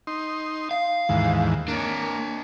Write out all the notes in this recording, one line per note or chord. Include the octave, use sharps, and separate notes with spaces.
D#4 C6
F5
D#2 G#2 E3
A#3 D4 C#5